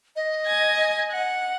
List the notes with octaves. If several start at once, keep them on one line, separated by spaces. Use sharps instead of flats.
D#5
G#5 G#6 A#6
F#5